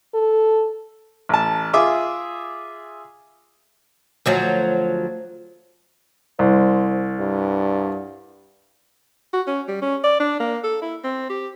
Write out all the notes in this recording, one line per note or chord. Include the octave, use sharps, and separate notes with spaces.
A4
A1 A5
F4 G#4 E5 D6 E6
D2 F3 F#3
C2 C5
G2
F#4
C#4
G3
C#4
D5
D4
A#3
A4
E4
C4
G4